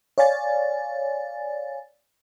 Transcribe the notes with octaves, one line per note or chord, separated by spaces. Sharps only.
C#5 D5 F5 G#5 A6